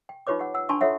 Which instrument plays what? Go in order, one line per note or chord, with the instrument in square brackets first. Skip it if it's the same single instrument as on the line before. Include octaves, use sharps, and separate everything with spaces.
[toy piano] G5
D#4 F4 G4 B4 C#5 D6
G4 F#5
F#5 E6
D4 G#5 A5 C6 C#6
F4 A4 C#5 E5 F#5